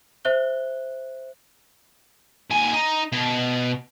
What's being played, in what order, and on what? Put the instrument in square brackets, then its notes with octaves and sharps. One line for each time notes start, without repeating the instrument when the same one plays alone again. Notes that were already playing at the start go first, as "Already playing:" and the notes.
[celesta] C5 E5 F#6 G7
[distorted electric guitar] D#2 G#5
D#4
B2